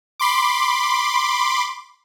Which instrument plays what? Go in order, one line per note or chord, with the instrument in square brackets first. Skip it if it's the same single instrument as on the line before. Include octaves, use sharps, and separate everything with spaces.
[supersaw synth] B5 C6 D6